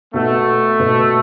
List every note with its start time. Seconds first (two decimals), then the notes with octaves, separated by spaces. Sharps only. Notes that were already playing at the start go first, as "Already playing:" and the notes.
0.14 B2 A3 B3 F#4
0.79 B2 B3 F#4